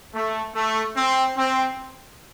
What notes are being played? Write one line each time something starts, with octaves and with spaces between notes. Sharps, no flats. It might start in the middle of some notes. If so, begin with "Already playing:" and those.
A3
A3
C4
C4